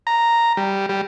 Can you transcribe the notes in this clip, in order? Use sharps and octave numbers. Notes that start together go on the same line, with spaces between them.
A#5
G3
G3